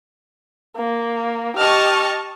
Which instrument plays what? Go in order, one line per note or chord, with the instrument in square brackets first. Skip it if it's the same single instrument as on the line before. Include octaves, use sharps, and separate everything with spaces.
[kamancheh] A#3
[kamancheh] G4 F6 [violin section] D#5 A5 C#6